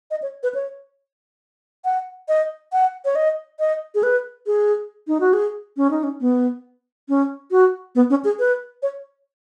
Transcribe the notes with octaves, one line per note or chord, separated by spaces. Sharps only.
D#5
C#5
B4
C#5
F#5
D#5
F#5
C#5
D#5
D#5
G#4
B4
G#4
D#4
F#4
G#4
C#4
D#4
C#4
B3
C#4
F#4
B3
C#4
G#4
B4
C#5